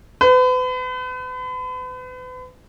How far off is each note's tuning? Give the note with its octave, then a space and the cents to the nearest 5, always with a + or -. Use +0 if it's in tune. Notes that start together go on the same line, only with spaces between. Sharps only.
B4 +40